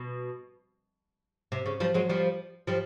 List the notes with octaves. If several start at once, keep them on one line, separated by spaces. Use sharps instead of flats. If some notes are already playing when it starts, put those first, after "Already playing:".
Already playing: B2
C3
C#3
F3 G3
F#3 G#3
F3 G3
F3 G3